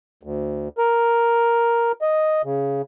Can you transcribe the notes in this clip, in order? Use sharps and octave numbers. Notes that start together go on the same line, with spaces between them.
D2
A#4
D#5
C#3